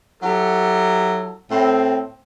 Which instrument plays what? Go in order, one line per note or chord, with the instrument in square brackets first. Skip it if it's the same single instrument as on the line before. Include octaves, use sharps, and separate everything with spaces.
[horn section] F#3 E4 G4 A4
A2 C4